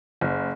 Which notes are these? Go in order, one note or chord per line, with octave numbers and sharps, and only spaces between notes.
F#1